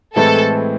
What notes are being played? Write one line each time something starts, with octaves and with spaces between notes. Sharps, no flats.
A2 E3 G#3 C4 E4 A4